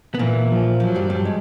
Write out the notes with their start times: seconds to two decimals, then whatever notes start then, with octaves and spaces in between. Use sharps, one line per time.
0.15 B3
0.19 A#2 E3 A#3
0.51 F3
0.80 F3 F#3
0.95 G2 G3
1.10 G2 G3
1.25 G#3